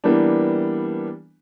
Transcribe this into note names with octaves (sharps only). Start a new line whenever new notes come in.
E3 G3 A#3 B3 D4